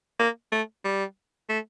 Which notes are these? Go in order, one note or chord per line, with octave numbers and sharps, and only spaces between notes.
A#3
A3
G3
A3